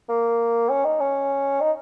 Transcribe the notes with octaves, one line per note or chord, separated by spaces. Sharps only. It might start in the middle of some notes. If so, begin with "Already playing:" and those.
A#3
C#4
D#4
C#4
D#4